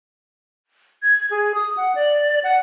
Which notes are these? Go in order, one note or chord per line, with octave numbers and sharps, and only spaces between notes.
G#6
G#4
D#6
F#5
D5
F#5